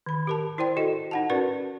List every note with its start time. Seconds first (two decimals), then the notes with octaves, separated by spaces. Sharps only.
0.06 D#3 B5
0.27 G4 A#4 A5
0.58 E4 C5 D5 G5 C6
0.77 F#4 A4 D#5
1.11 D#4 F#5 A5
1.30 C#4 F#4 A#4 B4 D5